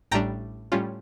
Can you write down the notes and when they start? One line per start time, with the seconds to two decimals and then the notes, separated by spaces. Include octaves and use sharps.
0.11 A1 A2 G3 D4 G5 A#5
0.72 A2 G3 C#4 F4